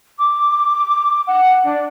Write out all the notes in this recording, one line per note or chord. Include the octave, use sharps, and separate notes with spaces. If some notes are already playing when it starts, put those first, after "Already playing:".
D6
F#5
D4